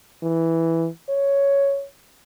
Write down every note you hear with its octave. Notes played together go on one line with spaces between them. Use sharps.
E3
C#5